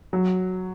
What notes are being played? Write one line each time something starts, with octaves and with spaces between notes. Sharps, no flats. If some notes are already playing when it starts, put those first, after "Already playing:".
F#3